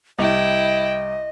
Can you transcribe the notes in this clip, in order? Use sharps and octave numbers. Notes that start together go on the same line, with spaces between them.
C2 E4 D#5 G5